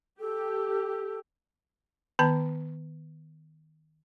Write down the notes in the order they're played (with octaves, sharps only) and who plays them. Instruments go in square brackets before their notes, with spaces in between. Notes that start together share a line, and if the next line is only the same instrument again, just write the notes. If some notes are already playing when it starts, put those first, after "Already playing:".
[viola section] G4 [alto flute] A4
[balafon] D#3 B3 A5 A#5